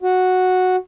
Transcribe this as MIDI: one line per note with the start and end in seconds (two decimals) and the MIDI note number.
0.02 0.76 66